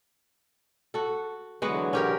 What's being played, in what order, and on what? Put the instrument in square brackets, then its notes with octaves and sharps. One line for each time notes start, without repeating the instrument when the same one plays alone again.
[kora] F#4 A4
[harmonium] D3 E3 F#3 [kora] G#3 B3 F#4
[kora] C#4 G4 A#4